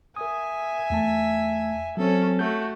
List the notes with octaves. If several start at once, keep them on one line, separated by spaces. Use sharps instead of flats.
A#4 E5 G#5 D#6
E2 A3 A5
F#3 C4 C#4 A4
A3 F#4 G6